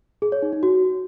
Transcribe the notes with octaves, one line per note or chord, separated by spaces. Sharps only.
G#4
C#5
D#4
D#4
F#4